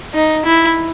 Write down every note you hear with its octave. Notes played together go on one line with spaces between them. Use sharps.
D#4
E4